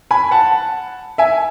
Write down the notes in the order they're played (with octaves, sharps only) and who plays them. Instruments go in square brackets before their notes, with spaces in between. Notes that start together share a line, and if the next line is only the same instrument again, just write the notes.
[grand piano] G#5 B5
F#5 A5
E5 G#5